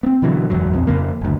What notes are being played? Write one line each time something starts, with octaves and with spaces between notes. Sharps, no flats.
B3 C4
B2 D3 E3 F#3
F#1 E2 G#2 F#3
A#1 F2 C4
F2 C#3 A#3
F#1 D2